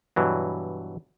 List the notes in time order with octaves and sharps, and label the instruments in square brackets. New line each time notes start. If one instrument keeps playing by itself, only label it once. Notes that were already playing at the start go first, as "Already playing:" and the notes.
[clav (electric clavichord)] G2 B2 E3 F#3